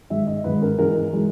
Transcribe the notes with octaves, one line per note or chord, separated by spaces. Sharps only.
G#2 D#3 G#3 E5
D#5
G#2 D#3 G#3 B4
A#4
G#2 E3 G#3 A#4
E3 G#3